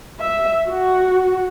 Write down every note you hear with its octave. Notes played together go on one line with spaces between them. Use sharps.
E5
F#4